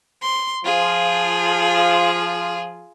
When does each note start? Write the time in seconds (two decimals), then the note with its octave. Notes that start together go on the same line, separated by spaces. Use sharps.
0.22 C6
0.65 F3 F4 G#4